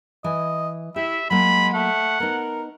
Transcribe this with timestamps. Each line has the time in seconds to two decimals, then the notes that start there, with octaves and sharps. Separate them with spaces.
0.24 E3 D#5 G#5
0.96 E4 G4 E5
1.31 F#3 G#3 A#3 B5
1.74 A3 F#5
2.20 B3 D#4 A#4